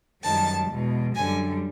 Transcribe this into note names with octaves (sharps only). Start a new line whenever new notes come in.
F#2 D#3 G3 A5
E2 B2 G#3
F#2 D3 G3 G#5